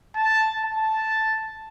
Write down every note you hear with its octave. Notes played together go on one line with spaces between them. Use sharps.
A5
A5